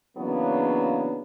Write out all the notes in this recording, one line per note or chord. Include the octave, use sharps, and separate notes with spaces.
C#3 E3 F#3 A#3 B3 D4